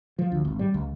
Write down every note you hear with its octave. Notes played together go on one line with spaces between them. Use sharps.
F3
D2
G#1
G3
C#2